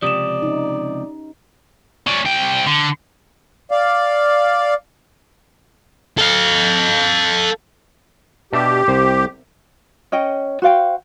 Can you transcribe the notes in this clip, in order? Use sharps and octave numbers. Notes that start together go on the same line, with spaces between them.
C#2 C3 F3 G4 D5 D#6 E7
C#4 D#4
C#4 D5
C2 G5
D3
D5 F5
A4 F5
B2 D4 G4 E5
C2 C5
C#4 C#5 D#5 G5
F#4 C5 F5 G5